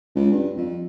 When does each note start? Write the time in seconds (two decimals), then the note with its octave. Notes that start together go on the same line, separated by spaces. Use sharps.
0.15 C#2
0.32 G2
0.57 F2